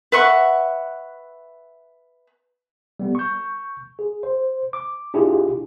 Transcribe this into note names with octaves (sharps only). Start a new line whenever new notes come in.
B4 E5 F#5 C#6
G3 B3
C#6 G6
G#4
C5
D6
D4 E4 F4 G4 G#4